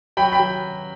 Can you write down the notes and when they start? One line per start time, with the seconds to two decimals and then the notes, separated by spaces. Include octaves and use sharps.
0.17 F#3 G5 B5
0.32 G5 B5
0.39 F#3